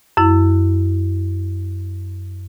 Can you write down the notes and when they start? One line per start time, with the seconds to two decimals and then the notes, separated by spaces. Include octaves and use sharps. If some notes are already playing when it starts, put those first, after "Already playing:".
0.17 F#2 E4